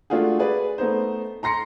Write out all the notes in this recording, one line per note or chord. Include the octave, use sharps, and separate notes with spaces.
G#3 A3 D4 F4 F#4 G#4
G#4 B4 D5
A3 B3 D#4 C5
A#5 C6 A#6 C7 C#7